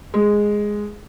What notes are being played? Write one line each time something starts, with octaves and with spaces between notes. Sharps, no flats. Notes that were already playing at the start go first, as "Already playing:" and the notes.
G#3